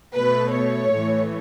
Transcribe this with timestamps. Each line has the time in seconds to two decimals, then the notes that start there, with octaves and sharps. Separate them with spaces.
0.15 B2 A3 B4
0.54 C#5
0.92 A2 E3 A3